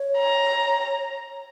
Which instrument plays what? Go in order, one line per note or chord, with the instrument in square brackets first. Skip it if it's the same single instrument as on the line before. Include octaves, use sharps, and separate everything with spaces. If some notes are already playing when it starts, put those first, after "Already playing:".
Already playing: [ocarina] C#5
[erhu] A#5